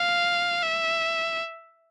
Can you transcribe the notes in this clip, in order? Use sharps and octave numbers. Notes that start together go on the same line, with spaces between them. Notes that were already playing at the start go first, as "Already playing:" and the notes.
Already playing: F5
E5